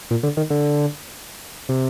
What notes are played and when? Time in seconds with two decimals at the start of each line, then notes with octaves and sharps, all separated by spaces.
0.11 A#2
0.23 D3
0.37 D#3
0.50 D3
1.69 C3